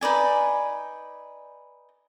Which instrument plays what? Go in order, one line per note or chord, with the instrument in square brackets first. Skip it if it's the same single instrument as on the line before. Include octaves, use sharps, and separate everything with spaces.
[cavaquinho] D#4 B4 D5 G#5